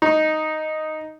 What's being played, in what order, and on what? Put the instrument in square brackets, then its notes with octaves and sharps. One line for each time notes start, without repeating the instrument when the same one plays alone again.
[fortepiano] D#4